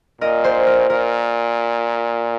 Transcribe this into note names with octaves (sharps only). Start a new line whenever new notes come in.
A#2 A#4 D#5
C5
A#4
A#2 A#4